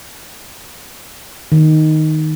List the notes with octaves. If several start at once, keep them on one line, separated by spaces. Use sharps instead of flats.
D#3